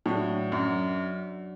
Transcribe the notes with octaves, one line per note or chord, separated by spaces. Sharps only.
A2 F#3 D4 F#4 D5
F#2